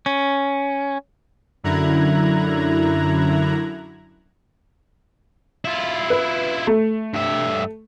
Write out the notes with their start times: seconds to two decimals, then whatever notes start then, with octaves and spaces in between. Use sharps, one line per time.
0.06 C#4
1.64 F#2 D3 E4 A#5 F#6 G#6
5.65 E4 F4
6.10 B4
6.67 A3
7.13 G2 E5